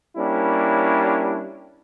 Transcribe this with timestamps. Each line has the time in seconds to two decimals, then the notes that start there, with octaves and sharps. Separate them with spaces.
0.16 G3 A#3 C#4 D4 E4